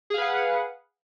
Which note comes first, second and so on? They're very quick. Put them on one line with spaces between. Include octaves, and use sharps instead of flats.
G#4 F5 B4 F#5